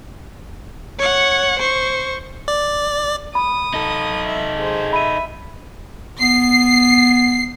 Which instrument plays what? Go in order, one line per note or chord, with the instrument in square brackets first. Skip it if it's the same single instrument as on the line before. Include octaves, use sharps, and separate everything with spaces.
[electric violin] C#5 F#5
C5 C#6
[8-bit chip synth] D5
[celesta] B5 [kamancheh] D#6
[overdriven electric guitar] D#4 A4
[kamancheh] E5
G#4 C5
[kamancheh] E5 [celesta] B5 D#7
[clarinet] B3 [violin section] C7